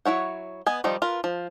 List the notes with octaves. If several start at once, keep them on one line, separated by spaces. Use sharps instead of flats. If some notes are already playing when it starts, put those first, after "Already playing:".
F#3 E4 C#5 F#5
B3 D#5 G#5
D#3 F3 G3 D#4
F4 A#4 B4
F3